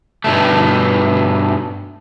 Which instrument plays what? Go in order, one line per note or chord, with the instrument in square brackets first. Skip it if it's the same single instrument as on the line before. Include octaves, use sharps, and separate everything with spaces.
[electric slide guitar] G2 B2 A3